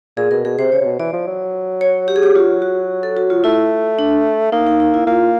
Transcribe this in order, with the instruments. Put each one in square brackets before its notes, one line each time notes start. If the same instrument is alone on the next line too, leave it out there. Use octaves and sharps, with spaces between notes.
[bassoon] A#2 [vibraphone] G#4
[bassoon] B2 [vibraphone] A#4
[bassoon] B2 [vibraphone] G#4
[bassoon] C3 [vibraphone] C5
[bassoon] C#3 [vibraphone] C#5
[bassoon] C3
B2
[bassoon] E3 [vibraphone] D5
[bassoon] F3
F#3
[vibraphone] C#5
G4
G#4
G4
[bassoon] F#3 [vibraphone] F4
[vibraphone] F#4
A4
F#4
F4
[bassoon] A3 [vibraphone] E4
[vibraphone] D4
[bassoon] A#3 [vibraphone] D#4
[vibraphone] D#4
D#4
E4
[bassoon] A#3 [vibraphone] F4